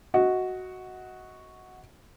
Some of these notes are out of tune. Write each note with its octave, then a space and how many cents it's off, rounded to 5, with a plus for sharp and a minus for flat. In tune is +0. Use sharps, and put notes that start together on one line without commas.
F#4 +0 D#5 +25